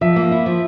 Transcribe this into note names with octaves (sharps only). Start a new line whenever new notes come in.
F3 E5
A#3
E4
F3